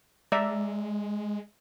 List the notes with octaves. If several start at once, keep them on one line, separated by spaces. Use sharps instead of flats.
G#3 D5 E5 A#5